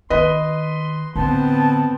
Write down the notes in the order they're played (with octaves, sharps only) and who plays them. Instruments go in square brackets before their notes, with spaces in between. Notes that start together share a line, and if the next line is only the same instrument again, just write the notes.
[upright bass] D#3 [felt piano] B4 D#5 [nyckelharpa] C6
[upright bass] A2 D3 [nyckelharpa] B3 C4 [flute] A5